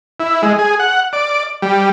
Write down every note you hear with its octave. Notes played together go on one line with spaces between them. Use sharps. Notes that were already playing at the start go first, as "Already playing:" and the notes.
E4
G#3
G#4
F#5
D5
G3